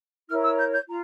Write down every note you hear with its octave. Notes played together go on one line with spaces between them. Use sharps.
E4 A#4 C#5 F6
E6
G6
G6
F4 A#5